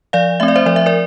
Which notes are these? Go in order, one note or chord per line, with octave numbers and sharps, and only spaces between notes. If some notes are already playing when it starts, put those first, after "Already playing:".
F3 D5 F5
A3 C4 E5
D5
C5 E5
F3 D5
E5
A#4 D5